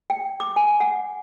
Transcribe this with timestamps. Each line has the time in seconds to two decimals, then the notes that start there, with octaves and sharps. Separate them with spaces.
0.10 G5
0.40 D6
0.56 G#5
0.80 F#5